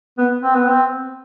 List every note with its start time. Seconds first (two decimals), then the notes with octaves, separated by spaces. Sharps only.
0.18 B3
0.42 C4
0.56 B3
0.70 C4